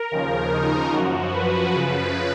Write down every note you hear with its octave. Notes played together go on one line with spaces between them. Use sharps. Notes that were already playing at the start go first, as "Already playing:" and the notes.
Already playing: A#4
D#2 C#3 F3
D#4
F#2 F3 F#4
B4
F#2 C#3 F3